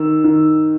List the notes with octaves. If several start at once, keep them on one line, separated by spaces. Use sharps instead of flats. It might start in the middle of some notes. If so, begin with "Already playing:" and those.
Already playing: D#3 E6
D#3